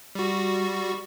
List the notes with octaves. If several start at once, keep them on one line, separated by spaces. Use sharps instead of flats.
G3 F#4